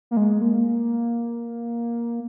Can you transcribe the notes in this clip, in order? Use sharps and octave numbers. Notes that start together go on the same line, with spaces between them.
A#3
G#3
A#3